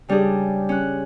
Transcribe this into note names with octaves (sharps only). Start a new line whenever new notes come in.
C#3 G3 D4 G4 G#4
C#4 F#6